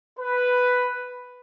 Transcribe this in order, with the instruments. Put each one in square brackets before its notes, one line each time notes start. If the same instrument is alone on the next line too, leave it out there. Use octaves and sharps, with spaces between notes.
[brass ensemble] B4